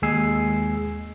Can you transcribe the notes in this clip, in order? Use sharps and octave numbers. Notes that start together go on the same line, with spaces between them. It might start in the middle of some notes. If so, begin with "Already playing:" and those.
D#2 G#3 G#4 G#5 E6 C7